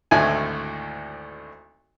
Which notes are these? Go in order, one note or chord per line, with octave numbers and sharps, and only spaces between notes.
G#1 D2 A2 A3 E4 G#5